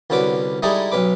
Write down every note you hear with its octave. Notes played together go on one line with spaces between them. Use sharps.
C2 D3 C#4 F#4 B4 D6
G3 G#3 D#4 E4 G#4 A4
B1 C#4 B4 D6